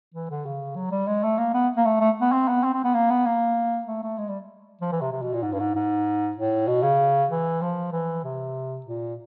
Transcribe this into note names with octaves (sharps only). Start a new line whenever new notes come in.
E3
D3
C#3
F#3
G3
G#3
A3
A#3
B3
A#3
A3
A3
B3
C4
B3
C4
C4
B3
A#3
B3
A#3
A3
A3
G#3
G3
F3
E3
C3
C3
B2
A#2
G#2
G2
G#2
G#2
A2
B2
C#3
E3
F3
E3
C3
A#2